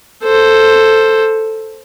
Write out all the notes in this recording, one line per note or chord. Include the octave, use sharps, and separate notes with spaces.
A4 C5